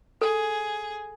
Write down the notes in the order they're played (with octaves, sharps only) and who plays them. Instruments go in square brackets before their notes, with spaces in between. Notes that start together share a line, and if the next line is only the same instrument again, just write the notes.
[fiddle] G#4 [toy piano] A4